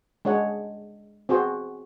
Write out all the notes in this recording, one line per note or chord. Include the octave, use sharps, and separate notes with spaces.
G#3 D4 C#5 F#5
C4 F#4 G#4 C5